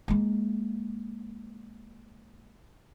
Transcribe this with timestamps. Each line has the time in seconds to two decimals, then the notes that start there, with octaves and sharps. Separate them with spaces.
0.08 G#3 A#3